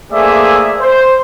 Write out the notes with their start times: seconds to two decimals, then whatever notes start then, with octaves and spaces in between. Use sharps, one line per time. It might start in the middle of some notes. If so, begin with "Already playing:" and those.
0.12 A3 A#3 G#4 C5 D5 E5
0.81 C5